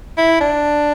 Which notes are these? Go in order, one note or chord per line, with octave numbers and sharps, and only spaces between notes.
E4
D4